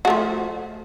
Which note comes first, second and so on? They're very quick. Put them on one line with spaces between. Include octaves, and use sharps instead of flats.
F#4 A3 F3